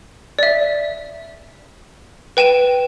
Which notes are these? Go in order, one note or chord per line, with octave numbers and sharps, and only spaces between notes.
D5 E5
B4 G5 D#7 E7